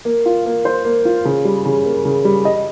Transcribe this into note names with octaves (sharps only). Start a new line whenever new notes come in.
A#3
F4
A#3
C5
A#3
F4
C#3
G3
C#3
A#3
C#3
G3
D#5